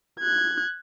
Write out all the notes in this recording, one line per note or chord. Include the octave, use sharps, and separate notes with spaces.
F#6 G#6